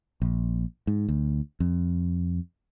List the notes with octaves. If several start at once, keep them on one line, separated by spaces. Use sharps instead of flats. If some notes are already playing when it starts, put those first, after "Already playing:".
A#1
G#2
D2
F2